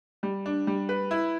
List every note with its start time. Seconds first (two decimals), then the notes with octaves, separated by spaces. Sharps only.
0.23 G3
0.46 D4
0.67 G3
0.89 B4
1.11 E4